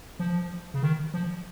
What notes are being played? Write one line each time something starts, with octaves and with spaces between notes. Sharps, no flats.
F3
C#3
D#3
F3